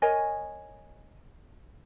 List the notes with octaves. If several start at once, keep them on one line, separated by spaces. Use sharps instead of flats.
A#4 C#5 D#5 G#5